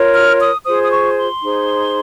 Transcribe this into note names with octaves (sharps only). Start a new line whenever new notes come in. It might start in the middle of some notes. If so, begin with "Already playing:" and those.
Already playing: F4 A#4 C#5
F6
D#6
F4 G#4 C5 D#6
D#6
C#6
C6
D#4 G#4 C5